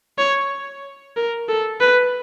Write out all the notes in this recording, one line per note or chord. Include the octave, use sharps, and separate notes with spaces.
C#5
A#4
A4
B4